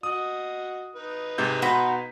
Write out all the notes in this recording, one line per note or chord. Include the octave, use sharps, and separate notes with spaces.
F#4 D#5 D#6
D#4 B4
G#2 C3 G6
B2 F#4 C5 A#5 B5 B6